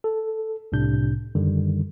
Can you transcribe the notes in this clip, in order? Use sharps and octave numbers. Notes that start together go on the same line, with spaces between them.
A4
C2 A2 C3 D4 G6
F#2 D3 D#3 G3